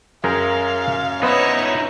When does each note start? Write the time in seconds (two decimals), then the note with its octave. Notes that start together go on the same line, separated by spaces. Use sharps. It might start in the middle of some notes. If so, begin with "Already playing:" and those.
0.24 F#2 G#4 A#4 F5 G5
1.23 B3 D#4 E4 C#5